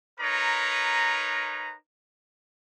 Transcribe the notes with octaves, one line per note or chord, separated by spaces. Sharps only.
D#4 A#4 B4 C#5 A#5